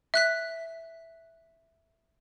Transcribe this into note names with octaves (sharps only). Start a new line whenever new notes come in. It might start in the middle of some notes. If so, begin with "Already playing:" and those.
E5 F#6 B6